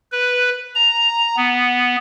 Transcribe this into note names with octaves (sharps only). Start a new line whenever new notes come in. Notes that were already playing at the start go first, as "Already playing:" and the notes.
B4
A#5
B3